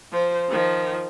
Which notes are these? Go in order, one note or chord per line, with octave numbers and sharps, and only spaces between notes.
F3 C5
D#3 F3